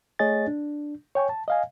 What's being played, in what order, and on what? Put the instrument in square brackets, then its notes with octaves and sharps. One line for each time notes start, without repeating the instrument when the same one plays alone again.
[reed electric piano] A3 G#4 C#5 D#5 G#5 A6
D4
C#5 G5 G#5 C#6
A5
D#5 F5 G#5